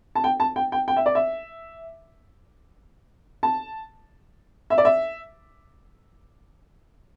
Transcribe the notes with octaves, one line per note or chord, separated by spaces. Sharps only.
A5
G5
A5
G5
G5
G5
E5
D5
E5
A5
E5
D5
E5